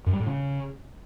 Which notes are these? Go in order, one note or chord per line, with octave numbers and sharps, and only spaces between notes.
F#2
G3
A2
C#3